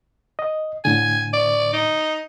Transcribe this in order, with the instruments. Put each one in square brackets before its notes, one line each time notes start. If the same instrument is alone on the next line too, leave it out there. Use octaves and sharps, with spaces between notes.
[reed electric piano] D#5
[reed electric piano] A2 D3 [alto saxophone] G#5
[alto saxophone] D5
D#4